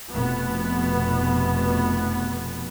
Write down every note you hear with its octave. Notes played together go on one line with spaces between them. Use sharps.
F1 B2 B3